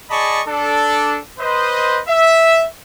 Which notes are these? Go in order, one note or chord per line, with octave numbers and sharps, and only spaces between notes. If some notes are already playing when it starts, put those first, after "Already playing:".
G#4 D5 D#5 A5 B5 C#6
D4 A4
B4 C5 D#5
E5